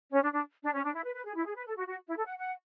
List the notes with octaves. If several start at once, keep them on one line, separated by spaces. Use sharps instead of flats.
C#4
D4
D4
D4
C#4
D4
E4
B4
B4
G#4
E4
G#4
B4
A4
F#4
F#4
E4
A4
F#5
F#5